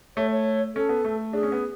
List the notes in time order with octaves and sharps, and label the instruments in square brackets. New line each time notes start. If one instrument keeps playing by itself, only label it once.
[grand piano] A3 [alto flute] C#5
[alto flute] C#5
[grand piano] C#4 [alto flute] A4
[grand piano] B3
A3
[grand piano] D4 [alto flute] G#4
[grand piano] C#4
B3